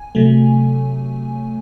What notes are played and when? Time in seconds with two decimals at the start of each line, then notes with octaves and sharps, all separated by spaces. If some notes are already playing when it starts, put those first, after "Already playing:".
Already playing: G#5
0.15 C3 F#3 A3